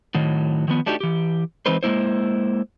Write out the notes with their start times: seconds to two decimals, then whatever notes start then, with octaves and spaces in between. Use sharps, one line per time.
0.15 A2 D#3 F#3
0.68 D#3 F3 B3
0.86 A3 D4 D#4 F#4 G4
1.01 E3 G4
1.66 E3 G#3 C4 D#4 B4 C5
1.83 G#3 A#3 E4 C5